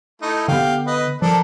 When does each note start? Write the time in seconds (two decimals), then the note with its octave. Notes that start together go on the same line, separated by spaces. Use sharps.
0.22 A3 D#4 E4
0.48 D3 B3 G4 F5
0.87 B4 D#5
1.22 F3 D4 A4 A#4